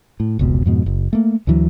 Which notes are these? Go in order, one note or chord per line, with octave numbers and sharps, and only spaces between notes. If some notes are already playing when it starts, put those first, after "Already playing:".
A2
F1 C#2 B2
F2 G#2 B2
F#1
A3 A#3
D2 D3 E3 F#3